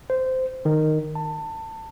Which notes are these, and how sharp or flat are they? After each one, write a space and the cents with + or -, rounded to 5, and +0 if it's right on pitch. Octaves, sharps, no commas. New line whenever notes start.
C5 -15
D#3 -10
A5 +25